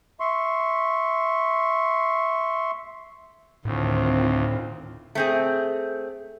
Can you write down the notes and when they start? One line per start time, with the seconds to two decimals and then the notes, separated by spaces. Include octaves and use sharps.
0.20 E5 C6 C#6
3.65 D2 A2 D#3 C4 F4
5.15 A3 C4 G#4